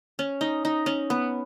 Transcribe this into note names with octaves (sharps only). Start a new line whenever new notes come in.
C#4
D#4
D#4
C#4
B3